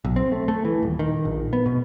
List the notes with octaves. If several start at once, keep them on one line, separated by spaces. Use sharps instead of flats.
B1
C4
A3
A3
E3
D#1
D#3
A#1
B3
B2